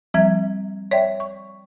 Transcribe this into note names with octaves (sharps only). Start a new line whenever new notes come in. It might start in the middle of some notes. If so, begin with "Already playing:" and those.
F3 G3 C4 E5 G#6
C#5 D5 E5 G5
C#6